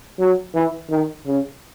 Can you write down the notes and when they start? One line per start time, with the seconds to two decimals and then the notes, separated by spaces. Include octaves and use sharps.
0.19 F#3
0.54 E3
0.90 D#3
1.26 C#3